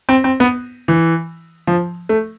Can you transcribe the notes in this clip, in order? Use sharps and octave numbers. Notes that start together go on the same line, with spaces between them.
C4
C4
B3
E3
F3
A3